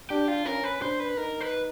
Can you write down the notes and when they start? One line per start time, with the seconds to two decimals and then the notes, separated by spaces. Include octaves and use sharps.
0.10 D4 G4
0.28 F4
0.46 C#4 A#4
0.64 B4
0.82 D4 C5
1.00 B4
1.17 D#4 A#4
1.41 B4